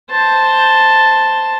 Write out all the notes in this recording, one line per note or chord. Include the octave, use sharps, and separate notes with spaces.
C5 A5